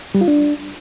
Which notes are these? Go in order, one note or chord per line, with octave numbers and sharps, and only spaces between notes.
G3
F4
D4